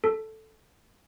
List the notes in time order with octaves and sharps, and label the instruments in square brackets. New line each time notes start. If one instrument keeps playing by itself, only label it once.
[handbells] A4